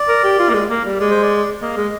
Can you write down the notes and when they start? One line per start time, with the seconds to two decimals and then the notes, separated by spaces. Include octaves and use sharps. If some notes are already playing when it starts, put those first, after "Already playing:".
Already playing: D5
0.08 A#4
0.24 G4
0.39 F4
0.49 A#3
0.54 G#3
0.69 A#3
0.85 G3
1.00 G#3 D5
1.11 C5
1.22 D5
1.62 A#3 D#5
1.77 G#3